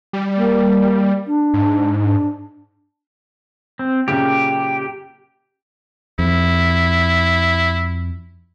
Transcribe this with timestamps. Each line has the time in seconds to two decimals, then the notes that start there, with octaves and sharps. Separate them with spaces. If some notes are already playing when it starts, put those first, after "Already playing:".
0.13 G3
0.37 A#3
1.27 D4
1.54 G#2
2.04 D4
3.79 C4
4.08 F#2 A#2 C#3 G4
6.19 F2 E4